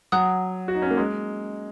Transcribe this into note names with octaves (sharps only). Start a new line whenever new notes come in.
F#3 F#5 D#6 F#6
F#4
D#4
C#4
A#3
G#3